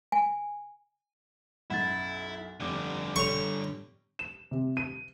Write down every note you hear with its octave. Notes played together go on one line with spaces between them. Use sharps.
G#5
B1 F#2 E4 F#5 A6
F1 D3 G3 D6
G4 A4 C#5 C#6 F7
E7
C3
D#7